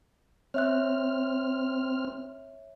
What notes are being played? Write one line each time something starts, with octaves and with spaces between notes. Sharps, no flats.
C4 C#5 E5 F6 F#6